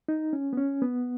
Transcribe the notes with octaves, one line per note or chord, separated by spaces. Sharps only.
D#4
C#4
B3
C#4
B3